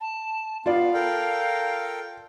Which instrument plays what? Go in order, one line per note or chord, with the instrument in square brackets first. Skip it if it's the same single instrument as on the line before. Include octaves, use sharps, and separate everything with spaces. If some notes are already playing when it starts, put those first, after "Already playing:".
[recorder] A5
[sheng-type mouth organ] B3 [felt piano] F4 D5 [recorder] F5
[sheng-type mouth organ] A4 A#4 G5